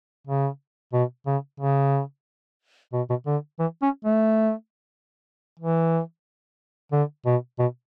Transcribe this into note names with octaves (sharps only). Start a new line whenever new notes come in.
C#3
B2
C#3
C#3
B2
B2
D3
E3
C#4
A3
E3
D3
B2
B2